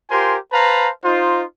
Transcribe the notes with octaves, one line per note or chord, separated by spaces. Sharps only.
F4 G4 A#4 C5 G#5 C6
B4 C5 F5 A5 A#5
D#4 F4 C5